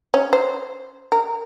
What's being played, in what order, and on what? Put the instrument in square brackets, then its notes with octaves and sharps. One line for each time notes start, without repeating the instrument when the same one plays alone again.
[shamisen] C#4
C5
A#4